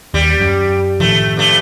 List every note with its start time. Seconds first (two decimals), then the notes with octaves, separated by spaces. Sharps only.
0.14 D#2 G3
0.40 F#2
1.00 A2 D#3 F3 A3
1.37 G2 A3